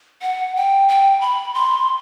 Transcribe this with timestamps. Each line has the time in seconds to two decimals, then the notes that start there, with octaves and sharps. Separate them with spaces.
0.22 F#5
0.56 G5
0.89 G5
1.21 B5
1.54 C6